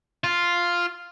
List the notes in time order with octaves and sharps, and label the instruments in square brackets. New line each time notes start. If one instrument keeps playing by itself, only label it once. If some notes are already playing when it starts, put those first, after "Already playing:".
[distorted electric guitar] F4